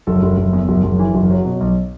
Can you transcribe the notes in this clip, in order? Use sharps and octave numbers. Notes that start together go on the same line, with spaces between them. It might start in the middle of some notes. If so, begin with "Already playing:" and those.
F#1 A4
F#1
F#1
E2
F#1
F#1
E3
F#1
F#3
B2
B1